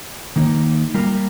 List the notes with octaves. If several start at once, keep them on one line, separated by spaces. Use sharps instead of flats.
D#3 A#3 D#4 A#4
G3 A#3 F4 A#4